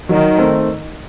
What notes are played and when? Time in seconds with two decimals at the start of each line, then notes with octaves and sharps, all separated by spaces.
0.09 D#3 F#3
0.38 A3 C4